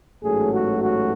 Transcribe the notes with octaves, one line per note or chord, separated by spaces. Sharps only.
A1 G#2 F#3 A3 G#4
F#4
F#4